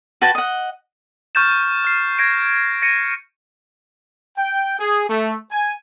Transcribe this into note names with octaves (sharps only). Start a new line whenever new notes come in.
F#4 B4 G5 A5
D#5 F#5
C#6 F6 G6 A6 E7
F6 C7
G#6 A#6 D7
A#6 C#7 D#7
G5
G#4
A3
G#5